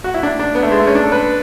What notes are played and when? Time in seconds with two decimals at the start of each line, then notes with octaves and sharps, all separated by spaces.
0.04 F#4
0.14 E4
0.23 D4
0.39 D4
0.55 B3
0.63 A3
0.72 G#3
0.80 A3
0.87 C#4
0.95 D4
1.03 A4
1.12 B4